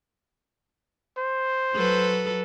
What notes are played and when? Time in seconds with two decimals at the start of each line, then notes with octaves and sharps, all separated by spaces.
1.17 C5
1.74 F#3 A4 B4